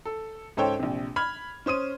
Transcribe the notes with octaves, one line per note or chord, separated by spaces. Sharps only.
A4
C#2 G#2 A4 C5 C#5 G5
A#1 C3
B5 F6 G#6
C#4 C5 D#6 D#7